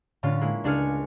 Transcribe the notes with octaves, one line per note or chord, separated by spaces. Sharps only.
A2 D3 C#4 F4
G#3 A#3 E4
C#2 D4 G#4 G#5 F6 C#7